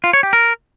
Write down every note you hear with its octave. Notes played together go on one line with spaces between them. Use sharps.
F4
C#5
G4
A#4